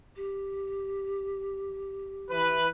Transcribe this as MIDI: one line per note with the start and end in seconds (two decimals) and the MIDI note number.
0.16 2.57 67
2.30 2.68 52
2.30 2.68 71